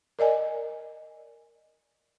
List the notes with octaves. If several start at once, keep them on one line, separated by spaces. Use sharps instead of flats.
A#4 D5 D#5 G#5